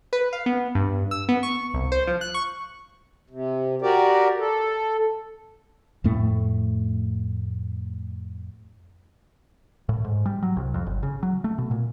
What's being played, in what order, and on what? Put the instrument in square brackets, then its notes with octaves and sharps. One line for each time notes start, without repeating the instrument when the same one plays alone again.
[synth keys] B4
F5
B3
G2
E6
B3
C#6
C2
C5
F3
F#6
C#6
[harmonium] C3
F#4 G4 A#4 D5
A4
[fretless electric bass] F2 A2 A3
[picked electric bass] A2
G#2
G3
F#3
C2
F2
G1
C#3
F#3
A3
B2
A#2